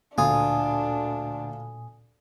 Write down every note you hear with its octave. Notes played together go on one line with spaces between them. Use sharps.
D2 A#2 D4 F4 G#5 D#6